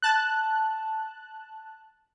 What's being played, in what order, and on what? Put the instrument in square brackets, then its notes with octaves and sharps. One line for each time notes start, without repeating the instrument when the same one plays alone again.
[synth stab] A5 F#6